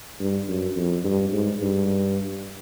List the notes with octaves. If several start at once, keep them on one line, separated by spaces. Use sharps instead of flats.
G2
F#2
F2
G2
G#2
G2